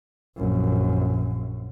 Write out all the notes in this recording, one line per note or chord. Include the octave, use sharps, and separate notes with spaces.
A#1 F#2